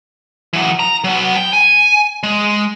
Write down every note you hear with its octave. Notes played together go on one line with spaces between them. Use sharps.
E3 F#3
A#5
F#3 B3
G5
G#5
G#3